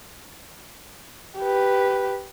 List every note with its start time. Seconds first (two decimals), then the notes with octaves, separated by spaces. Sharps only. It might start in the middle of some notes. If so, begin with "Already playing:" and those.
1.39 G4 B4